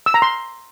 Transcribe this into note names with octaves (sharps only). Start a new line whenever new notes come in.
E6
A#5
C6